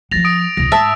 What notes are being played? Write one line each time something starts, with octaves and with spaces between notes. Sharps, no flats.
F3 F#3 A6 A#6 F7
D#6 D7
E1 C#2 A#6
G#2 E5 A5